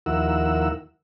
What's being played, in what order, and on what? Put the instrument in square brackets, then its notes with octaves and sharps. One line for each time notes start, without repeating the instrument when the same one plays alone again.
[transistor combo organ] D#2 F3 E4 A#4 F#5 E6